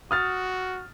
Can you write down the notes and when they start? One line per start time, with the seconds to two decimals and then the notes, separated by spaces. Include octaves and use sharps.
0.11 F#4 D#6 F6 A6